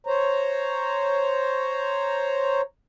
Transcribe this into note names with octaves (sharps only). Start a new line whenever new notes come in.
C5 C#5 A#5